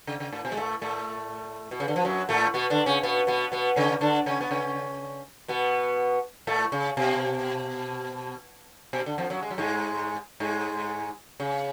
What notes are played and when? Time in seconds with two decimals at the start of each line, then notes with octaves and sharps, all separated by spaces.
0.07 C#3
0.20 C#3
0.33 A2
0.45 B2
0.52 G#3
0.57 A2 A3
0.82 A2 A3
1.71 B2
1.80 C#3
1.88 D3
1.96 F3
2.04 F#2 F#3
2.29 A2 A3
2.54 B2 B3
2.70 D3 D4
2.86 C#3 C#4
3.03 B2 B3
3.27 B2 B3
3.52 B2 B3
3.76 C#3 C#4
4.01 D3 D4
4.26 C#3 C#4
4.41 B3
4.51 C#3 C#4
5.48 B2 B3
6.47 A2 A3
6.72 C#3
6.97 B2
8.93 B2
9.06 D3
9.18 F2 F3
9.30 F#2 F#3
9.43 G#3
9.50 F#3
9.58 G#2 G#3
10.40 G#2 G#3
11.40 C#3